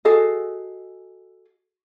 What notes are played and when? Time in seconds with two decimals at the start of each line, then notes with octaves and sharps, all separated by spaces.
0.05 F#4 G#4 A4 D#5